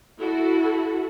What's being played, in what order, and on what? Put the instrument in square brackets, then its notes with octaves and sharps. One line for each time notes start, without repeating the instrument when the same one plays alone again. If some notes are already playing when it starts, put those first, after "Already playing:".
[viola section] E4 F#4 A4